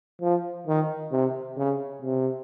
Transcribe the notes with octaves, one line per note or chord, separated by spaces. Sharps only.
F3
D#3
C3
C#3
C3